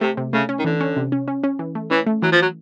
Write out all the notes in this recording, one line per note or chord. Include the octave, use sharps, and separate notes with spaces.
C3 A3
C3
C#3 A3
C#4
D#3
D3 E3
C#4
C3
C#4
C#4
C#4
E3
A3
E3 C#4
A3
E3 F#3
F3
F#3